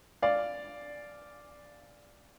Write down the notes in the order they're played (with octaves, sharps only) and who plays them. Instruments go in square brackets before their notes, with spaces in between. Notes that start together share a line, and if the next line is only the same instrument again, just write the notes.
[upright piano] D5 F5